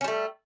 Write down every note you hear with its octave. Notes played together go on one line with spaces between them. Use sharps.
G3 A3 C#4